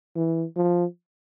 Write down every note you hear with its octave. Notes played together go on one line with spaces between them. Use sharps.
E3
F3